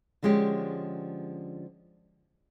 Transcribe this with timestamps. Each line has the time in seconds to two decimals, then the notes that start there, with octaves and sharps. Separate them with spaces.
0.23 D3 F3 G#3 C#4 G4